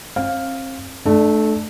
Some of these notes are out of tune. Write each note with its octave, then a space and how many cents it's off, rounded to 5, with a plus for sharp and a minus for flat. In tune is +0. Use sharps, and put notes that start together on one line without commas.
C4 +35 F5 +0
A3 -15 D4 +25